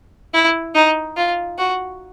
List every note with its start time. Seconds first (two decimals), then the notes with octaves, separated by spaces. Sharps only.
0.33 E4
0.75 D#4
1.17 F4
1.59 F#4